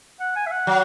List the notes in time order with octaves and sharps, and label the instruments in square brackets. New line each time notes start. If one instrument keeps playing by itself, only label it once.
[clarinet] F#5
G#5
E5
F#5
[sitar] F#3